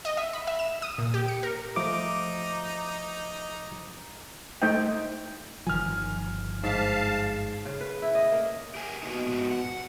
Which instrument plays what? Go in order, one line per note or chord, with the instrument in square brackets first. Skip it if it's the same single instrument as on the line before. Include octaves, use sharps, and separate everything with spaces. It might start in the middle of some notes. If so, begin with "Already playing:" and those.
[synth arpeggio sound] D#5
E5
B5
E5
E7
D#6
A#2
G4
C#7
A#4
[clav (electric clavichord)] F3 A3 [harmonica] D#4 [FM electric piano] D6
[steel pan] A3 D#4 C5 D#5 G5
[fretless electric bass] G1 D#3 F3 [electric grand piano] G#5 F6
[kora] G#2 E5 [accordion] F5 A5
[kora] C#3
B4
E4
D#5
A#3
[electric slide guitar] G4 A#4 G#5
[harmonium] B2 [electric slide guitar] A#3 B3 D#4
[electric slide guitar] G#2 F3 F#4
F#5